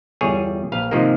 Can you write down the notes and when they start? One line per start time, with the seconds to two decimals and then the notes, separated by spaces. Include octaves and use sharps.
0.21 G1 E2 G3 G#4 C#5 G#5
0.72 A#1 B4 F5
0.91 G#2 C3 D#3 F3 G#3 A#3